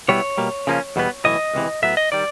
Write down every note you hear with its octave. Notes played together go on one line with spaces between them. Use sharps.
B2 G3 B3 E4 C#5
B2 G3 A#3
C#3 F3 A#3 C#4
E2 B2 G3 B3
B1 A2 E3 D#5
C#2 C3 E3
A2 F#3 B3 E5
D#5
D#3 G3 D5